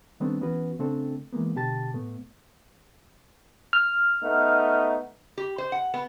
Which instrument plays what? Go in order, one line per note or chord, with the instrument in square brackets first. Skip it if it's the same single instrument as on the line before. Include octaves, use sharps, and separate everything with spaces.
[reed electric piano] D#3 G3 A3 B3 C4 D4
E3 B3 C#4 F#4 B4
C#3 A3 C4 D4 A4
E3 G#3 A#3 B3
B2 D3 G4 A5 A6
A2 A3 B3
[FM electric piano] F6
[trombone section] A3 B3 D#4
[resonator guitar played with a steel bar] G4
C5
F#5
B3